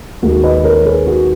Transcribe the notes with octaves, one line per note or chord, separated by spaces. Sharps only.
D#2 D#3 G#3 F#4
B4 D#5
A#4 C#5
G#4 B4
F#4